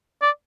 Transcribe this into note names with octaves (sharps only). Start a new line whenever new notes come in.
D5